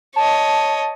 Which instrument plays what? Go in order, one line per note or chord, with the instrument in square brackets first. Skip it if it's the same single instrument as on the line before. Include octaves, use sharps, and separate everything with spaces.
[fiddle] C#5 D#5 [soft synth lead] A5